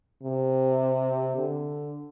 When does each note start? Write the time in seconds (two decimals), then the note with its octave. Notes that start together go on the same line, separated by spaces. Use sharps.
0.23 C3
1.36 D3